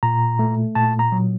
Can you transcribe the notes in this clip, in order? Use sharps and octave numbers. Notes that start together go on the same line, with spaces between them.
A#2 A#5
A3
A#2 A5
A#5
F#3